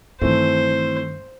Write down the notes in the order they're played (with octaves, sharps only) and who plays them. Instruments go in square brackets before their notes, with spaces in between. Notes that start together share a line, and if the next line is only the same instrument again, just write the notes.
[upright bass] G2 D#3 [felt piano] E3 A3 C4 [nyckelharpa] C5